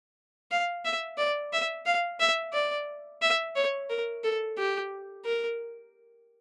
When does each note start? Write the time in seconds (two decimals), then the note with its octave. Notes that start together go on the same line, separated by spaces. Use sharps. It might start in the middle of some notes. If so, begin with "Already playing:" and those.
0.51 F5
0.85 E5
1.18 D5
1.53 E5
1.86 F5
2.20 E5
2.53 D5
3.22 E5
3.56 C#5
3.90 A#4
4.24 A4
4.58 G4
5.25 A#4